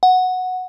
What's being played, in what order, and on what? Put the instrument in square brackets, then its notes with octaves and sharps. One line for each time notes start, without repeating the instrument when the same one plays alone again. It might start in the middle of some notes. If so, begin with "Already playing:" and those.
[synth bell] F#5